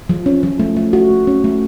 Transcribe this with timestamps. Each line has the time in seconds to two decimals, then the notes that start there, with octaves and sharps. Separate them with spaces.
0.09 F3
0.26 C#4
0.43 F3
0.59 A3
0.77 A3
0.93 F#4
1.10 A3
1.27 C#4
1.44 A3